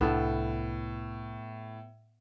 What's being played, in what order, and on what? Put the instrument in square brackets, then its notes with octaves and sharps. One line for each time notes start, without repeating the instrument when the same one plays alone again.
[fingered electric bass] C2 C4 D4 [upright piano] A2 [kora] B3 A4